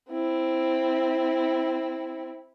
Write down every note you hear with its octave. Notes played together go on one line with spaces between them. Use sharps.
C4 E4